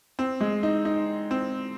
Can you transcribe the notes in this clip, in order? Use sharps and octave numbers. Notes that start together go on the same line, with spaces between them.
C4
G#3
D#4
D#4
C4